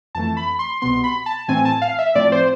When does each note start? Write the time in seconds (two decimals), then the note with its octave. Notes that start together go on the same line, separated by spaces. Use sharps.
0.15 F2 E3 A3 A5
0.37 B5
0.59 C6
0.82 C2 B2 B3 C6
1.04 B5
1.26 A5
1.48 A2 E3 A3 C4 G#5
1.65 A5
1.82 F5
1.99 E5
2.15 A2 F3 A3 C4 D5
2.32 C5